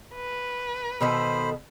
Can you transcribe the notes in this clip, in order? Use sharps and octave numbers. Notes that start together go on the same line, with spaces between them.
B4
B2 D#3 A4 C5 B5